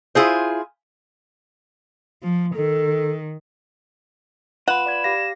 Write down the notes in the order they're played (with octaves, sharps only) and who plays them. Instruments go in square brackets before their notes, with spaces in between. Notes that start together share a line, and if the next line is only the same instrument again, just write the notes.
[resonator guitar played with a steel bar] E4 F4 G#4 C5
[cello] F3
[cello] D#3 [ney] A4
[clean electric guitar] F4 B4 [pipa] F#5 [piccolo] E7
[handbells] D5 B5 G#6
G4 F5 A#6